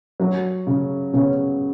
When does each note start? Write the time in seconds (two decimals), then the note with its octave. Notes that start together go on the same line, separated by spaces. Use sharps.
0.20 F#3
0.67 C#3
1.13 C#3 B3 C#4